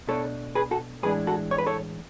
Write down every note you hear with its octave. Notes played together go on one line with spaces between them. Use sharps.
B2 A3 D4 A4 C#5
G#4 B4
F#4 A4
A2 E3 G#3 D4 G#4 B4
F#4 A4
C#5
B4
A4 C#5